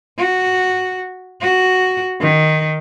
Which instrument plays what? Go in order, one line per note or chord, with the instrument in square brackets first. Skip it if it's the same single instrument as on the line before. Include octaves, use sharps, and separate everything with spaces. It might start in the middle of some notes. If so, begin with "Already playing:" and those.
[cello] F#4
F#4
D#3